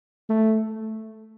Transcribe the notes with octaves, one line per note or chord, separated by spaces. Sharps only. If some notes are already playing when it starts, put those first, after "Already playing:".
A3